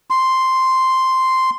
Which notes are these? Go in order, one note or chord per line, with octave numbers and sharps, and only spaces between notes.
C6